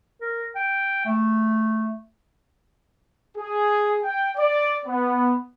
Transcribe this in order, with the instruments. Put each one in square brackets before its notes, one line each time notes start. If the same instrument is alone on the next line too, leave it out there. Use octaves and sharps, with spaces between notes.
[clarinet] A#4
G5
A3
[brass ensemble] G#4
G5
D5
B3